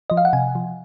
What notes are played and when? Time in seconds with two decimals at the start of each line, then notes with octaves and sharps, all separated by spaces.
0.10 F3 D#5
0.17 F5
0.25 F#5
0.33 C3 G#5
0.55 F3